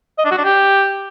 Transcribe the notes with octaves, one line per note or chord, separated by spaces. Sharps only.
D#5
D4
F#4
D4
G4